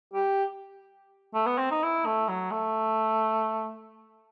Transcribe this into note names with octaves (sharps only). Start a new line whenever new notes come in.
G4
A3
B3
C4
D#4
E4
A3
F#3
A3